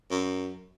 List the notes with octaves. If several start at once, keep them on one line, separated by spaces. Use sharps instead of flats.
F#2